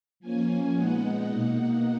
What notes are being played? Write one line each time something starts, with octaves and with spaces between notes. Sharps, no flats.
F3 A#3 C#4 G#5
A#2 G#3 B3 D#4 F#5
B2 A#3 D#4